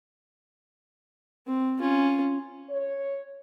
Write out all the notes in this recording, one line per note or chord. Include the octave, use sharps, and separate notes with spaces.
C4
C#4 F4
C#5